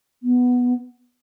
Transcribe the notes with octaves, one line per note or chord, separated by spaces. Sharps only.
B3